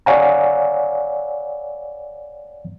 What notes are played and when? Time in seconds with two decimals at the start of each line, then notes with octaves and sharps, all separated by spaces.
0.06 C#5 D5 F5 F#5 G#5 A#5